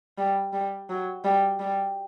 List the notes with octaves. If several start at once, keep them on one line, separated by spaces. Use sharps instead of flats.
G3
G3
F#3
G3
G3